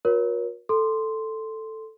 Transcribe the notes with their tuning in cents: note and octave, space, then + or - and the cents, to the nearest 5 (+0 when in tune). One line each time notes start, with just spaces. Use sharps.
F#4 -45 A#4 +35 C#5 +0
A4 +0 C6 -5